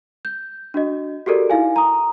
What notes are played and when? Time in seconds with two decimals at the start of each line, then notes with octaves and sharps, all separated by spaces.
0.25 G6
0.74 D4 F#4 D#5
1.26 F#4 G4 A4 A#4 D5
1.50 D#4 E4 F5 G#5
1.76 A#5 D#6